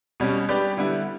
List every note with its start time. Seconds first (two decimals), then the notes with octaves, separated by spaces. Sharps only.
0.20 B2 G3 C#4
0.49 G3 D4 G4 B4 D5
0.77 D3 G3 B3 E4